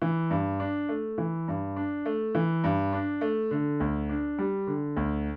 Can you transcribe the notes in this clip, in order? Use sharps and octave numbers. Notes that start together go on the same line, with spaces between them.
E3
G2
D4
A3
E3
G2
D4
A3
E3
G2
D4
A3
D3
D2
D4
G3
D3
D2